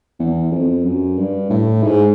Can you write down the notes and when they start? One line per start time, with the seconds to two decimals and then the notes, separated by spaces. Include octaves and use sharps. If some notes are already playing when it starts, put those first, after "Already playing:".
0.19 E2
0.51 F2
0.84 F#2
1.17 G2
1.50 A2
1.83 G#2